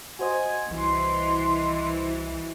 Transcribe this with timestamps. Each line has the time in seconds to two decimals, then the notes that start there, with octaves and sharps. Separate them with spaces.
0.19 F#4 C5 D#5 G#5
0.71 C2 E3 C6